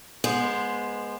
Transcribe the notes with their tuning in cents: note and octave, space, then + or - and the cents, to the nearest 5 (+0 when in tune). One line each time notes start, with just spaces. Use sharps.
G#3 +0 B3 -25 C5 +0